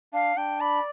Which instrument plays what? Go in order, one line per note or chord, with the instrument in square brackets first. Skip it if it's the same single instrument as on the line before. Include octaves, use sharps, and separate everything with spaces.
[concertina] D4 [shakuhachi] F5
[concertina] D4 [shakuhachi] G5
[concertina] D5 [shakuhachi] B5